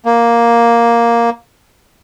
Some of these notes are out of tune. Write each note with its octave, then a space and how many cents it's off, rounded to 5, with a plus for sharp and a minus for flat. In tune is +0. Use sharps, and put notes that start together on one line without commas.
A#3 +5